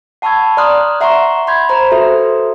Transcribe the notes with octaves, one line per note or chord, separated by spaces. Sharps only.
F#5 A5 B5 C#6 E6 G#6
D5 A#5 C6 D#6 F6 F#6
E5 F#5 A#5 C6 C#6
B5 C6 G6 G#6
C5 A#5
F#4 A4 B4 C5 E5